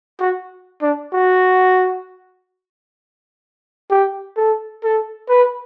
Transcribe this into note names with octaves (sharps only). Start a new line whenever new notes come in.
F#4
D4
F#4
G4
A4
A4
B4